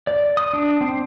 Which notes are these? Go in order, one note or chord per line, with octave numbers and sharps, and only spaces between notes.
D5
D#6
D4
C4